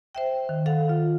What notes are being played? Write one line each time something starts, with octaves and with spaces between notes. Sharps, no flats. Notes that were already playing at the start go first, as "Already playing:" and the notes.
C5 E5 G5
D#3
A4 F5 F#5
F4